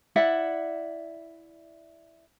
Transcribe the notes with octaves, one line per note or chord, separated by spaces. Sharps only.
E4 D5 E5 F#5